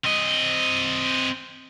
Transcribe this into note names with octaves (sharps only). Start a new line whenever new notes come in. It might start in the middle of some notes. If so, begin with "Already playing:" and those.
C4 D#5